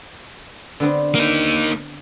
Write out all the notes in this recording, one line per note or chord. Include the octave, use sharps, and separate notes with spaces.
D3 B3 C4
A#3 D#4